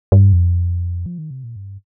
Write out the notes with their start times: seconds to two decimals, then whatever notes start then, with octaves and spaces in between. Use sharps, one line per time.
0.12 G2
0.33 F2
1.06 F3
1.18 D#3
1.31 C3
1.44 A#2
1.56 G2